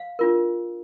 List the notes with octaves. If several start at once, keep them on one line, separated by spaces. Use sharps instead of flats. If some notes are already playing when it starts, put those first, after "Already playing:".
Already playing: F5
D4 F4 A#4